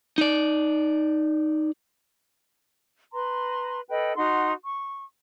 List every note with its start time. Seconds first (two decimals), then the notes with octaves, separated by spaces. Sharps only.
0.18 D#4 D5
3.12 B4 A#5 C6
3.89 A4 B4 D#5 G5
4.16 D#4 F#4 F#5 C6
4.64 C#6